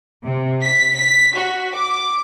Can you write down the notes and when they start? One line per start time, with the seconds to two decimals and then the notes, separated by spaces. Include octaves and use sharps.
0.25 C3
0.64 B6
0.96 B6
1.36 F#4
1.76 D6